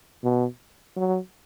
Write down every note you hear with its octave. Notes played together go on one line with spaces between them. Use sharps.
B2
F#3